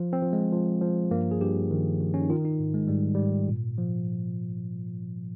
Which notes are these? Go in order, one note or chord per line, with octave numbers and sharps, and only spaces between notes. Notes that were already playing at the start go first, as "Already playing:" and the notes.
Already playing: F3
C4
F3
G#3
F3
F3
G2 A#3
G#4
G2 G4
D#3
D#3
C#4
D#4
D#3 F4
D#4
G#2
G#3
G#2 G3
G#2 G3
A#2
F3